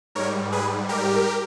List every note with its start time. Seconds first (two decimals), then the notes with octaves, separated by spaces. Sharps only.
0.15 G#2 G3 A#4 C#5
0.52 G#4 B4
0.89 G4 A#4